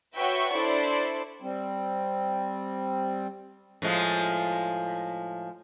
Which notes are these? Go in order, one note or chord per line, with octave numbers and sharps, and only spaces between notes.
F#4 B4 C#5 E5 G5 C#6
D4 E4 A4 C5 D5
G3 C4
A2 F3 G#3